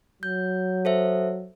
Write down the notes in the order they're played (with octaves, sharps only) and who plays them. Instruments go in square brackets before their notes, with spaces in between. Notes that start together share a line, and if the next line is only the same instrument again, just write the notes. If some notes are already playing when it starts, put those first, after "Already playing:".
[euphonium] F#3 [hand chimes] G6
[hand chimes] A4 C5 E5